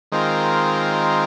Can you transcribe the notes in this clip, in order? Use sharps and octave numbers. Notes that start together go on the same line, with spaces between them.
D#3 G#3 C4 F4 A#4